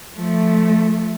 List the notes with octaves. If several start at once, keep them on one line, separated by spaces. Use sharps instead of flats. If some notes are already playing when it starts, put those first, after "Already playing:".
F3 A3